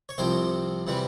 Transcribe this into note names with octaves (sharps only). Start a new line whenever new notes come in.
C#5
C2 C3 F3 C5
C3 E3 G3